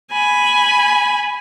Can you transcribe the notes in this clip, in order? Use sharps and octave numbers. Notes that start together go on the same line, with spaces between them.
G#5 B5